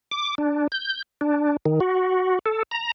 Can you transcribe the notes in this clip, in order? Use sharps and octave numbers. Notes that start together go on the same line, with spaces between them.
D6
D4
G6
D4
D#3
F#4
A4
A#5